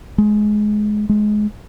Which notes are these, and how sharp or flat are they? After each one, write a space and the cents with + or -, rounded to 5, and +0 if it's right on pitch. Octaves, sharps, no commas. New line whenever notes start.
G#3 +20
G#3 +20